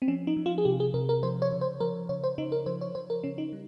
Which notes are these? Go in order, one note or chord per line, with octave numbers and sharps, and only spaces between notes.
C4
F3 C#4
D#4
F3
F4
G#4
C3 G4
G#4
C3 A#4
A#4
F3 C5
C#5
C#3
C5
F3 A#4
C#3 C#5
C5
C#3 D#4
A#4
F3 C5
C#5
F3 C5
A#4
C#3 C#4
D#4
G3